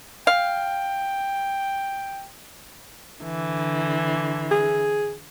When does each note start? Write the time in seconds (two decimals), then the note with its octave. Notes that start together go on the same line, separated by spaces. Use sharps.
0.27 F5 G5
3.22 D3 E3
4.51 G#4